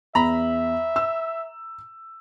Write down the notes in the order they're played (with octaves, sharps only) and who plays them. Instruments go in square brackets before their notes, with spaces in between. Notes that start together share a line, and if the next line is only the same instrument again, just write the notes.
[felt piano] E2 [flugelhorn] E5 [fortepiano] A#5 B5
[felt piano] E6